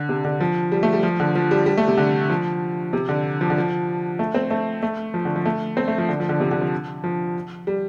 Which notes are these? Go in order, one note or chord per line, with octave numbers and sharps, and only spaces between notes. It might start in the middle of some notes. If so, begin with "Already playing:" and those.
Already playing: D3
C3
D3
F3
G3
A3
G3
F3
D3
F3
G3
G3
A3
C3
D3
F3
C3
D3
F3
D3
F3
A3
C4
A3
A3
F3
D3
F3
A3
C4
A3
F3
D3
F3
D3
C3
D3
F3
F3
G3